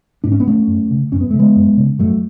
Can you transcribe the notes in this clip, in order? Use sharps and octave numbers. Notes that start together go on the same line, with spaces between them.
G#2 D4
C#4
B3
A3 C#4
F#2
C#3
F#2 C#4
B3
A3
C#3
G#3 B3
F#2
C#3
F#2 F#3 A3